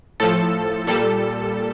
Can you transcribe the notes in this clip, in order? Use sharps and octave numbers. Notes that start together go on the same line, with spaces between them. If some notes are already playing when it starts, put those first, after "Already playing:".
A2 F3 A4
A#2 G3 A4